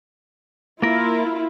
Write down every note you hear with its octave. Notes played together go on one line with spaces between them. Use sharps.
A#3 E4 F4 A#4